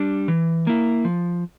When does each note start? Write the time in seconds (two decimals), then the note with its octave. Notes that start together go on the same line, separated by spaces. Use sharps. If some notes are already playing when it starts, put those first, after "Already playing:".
Already playing: G3 D4
0.28 E3
0.67 A#3 E4
1.05 F3